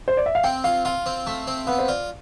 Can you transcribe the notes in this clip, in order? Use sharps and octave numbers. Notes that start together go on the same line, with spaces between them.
C5
D5
E5
F5
C4 G5
F4 F5
F4 F5
C4
A3
C4
B3 F5
C5
F4 D5